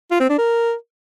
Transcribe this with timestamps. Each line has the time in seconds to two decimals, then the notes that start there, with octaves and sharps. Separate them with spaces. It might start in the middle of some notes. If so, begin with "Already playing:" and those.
0.11 F4
0.20 C4
0.29 D4
0.38 A#4